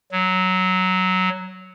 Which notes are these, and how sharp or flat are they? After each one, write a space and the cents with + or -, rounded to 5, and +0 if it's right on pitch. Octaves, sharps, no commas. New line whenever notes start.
F#3 +5